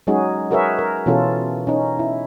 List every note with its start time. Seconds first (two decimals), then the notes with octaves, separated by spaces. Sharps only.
0.07 F#3 G#3 C#4 D#4 F#4 G#4
0.51 F#4 G#4 A#4 B4 C#5 E5
0.79 A#4
1.06 B2 E3 C#4 F4 A4
1.67 C#4 D#4
1.99 E4